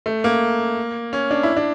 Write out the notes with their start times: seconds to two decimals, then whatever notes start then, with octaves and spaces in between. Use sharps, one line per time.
0.06 A3
0.24 A#3
1.13 C#4
1.31 D4
1.43 E4
1.56 D4